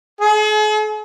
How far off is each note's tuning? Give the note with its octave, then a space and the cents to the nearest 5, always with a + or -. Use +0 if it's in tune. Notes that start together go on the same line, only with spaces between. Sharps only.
G#4 +45